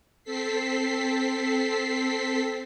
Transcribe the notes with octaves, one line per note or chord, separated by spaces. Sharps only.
C4 A4 B6 C7